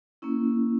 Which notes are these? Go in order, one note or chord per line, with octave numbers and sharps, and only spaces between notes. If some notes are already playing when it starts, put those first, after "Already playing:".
A#3 C#4 E4